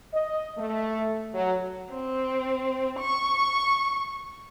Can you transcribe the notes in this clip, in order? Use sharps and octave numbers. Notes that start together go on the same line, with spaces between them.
D#5
A3
F#3
C4
C#6